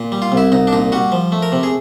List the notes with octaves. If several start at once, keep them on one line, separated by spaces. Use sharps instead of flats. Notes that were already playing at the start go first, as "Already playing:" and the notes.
Already playing: A#2
G3
F4
C2
E4
C2 D#4
D4
A#2 D#4
G3 F#4
F3
A3
A#4
C3
G#4